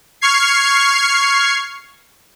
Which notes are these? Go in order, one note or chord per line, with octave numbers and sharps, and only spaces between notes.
C#6 F6 G#6 C7